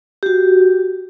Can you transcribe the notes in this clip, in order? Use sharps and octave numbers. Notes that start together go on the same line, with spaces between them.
F#4 G4